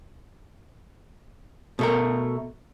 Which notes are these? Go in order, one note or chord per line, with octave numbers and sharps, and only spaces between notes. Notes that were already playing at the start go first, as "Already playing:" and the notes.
B2 A3 A#4